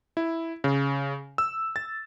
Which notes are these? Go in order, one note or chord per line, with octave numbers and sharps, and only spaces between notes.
E4
C#3
E6
A6